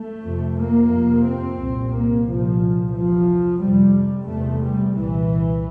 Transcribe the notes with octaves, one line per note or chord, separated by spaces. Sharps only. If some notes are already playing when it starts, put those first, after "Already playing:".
Already playing: A3
F2 C3
A#3
F2 C3
C4
C2 A#2
A#3
C2 A#2 F3
E2 C3 F3
F2 C3 G3
E2 C3 A3
G3
C2 A#2 E3